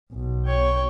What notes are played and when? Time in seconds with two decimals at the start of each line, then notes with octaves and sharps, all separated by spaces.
0.13 B1
0.46 C#5 G5